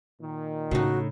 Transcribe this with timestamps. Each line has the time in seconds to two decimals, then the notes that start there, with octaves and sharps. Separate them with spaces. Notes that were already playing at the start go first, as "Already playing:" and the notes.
0.21 A#2 D#3
0.71 A2 C#3 D#4 F#4